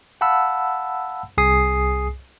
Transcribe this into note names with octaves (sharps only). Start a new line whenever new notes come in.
F5 F#5 A5 B5 E6
C2 G#4 G#5 D#6 C7